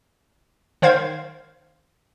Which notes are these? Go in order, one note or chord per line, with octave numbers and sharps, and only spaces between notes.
D#3 C5 F5 G#6